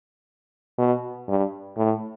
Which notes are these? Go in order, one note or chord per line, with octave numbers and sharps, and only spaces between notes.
B2
G2
A2